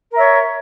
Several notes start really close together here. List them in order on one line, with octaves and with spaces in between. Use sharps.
A#4 E5 C#5